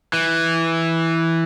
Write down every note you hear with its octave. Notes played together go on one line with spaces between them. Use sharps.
E3